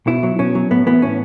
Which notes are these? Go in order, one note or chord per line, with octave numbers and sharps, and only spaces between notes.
B2 E4
F#3
B2 C#4
F#3
A2 B3
E3 B3
A2 C#4